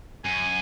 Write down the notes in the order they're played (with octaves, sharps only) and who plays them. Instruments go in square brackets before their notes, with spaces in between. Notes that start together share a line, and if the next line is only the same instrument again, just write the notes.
[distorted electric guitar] F#2 [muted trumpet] G#5